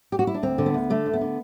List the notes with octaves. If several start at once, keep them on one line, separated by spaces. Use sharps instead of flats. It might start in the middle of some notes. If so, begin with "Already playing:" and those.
G4
F#4
E4
D4
D2 C4
D3
B3
D2
D3 A3
D2
B3
D3